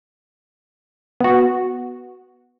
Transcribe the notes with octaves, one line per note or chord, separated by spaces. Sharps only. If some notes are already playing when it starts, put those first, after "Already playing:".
B3 F#4